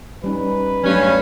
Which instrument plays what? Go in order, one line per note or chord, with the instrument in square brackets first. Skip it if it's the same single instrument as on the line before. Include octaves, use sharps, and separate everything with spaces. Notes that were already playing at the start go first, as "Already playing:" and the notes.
[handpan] G3 C#4 D#4 [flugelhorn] B4
[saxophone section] G2 C#4 [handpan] F#3 A3